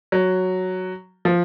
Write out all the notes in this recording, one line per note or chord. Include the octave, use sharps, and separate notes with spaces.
F#3
F3